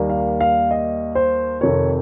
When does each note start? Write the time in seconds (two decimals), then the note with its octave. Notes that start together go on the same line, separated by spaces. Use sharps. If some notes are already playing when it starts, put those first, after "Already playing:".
Already playing: D#2 D#3 G3 A#3
0.10 F5
0.41 F5
0.71 D#5
1.15 C5
1.61 F2 C3 D#3 C#5